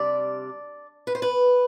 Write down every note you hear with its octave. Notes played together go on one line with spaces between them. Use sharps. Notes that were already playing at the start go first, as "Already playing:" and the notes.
Already playing: C3 G3 D4 D5
B4
C5
B4